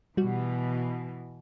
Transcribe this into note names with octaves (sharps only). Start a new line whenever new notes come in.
B2 E3 G3 F#4